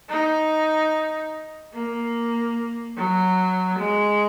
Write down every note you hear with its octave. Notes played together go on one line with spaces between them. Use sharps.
D#4
A#3
F#3
G#3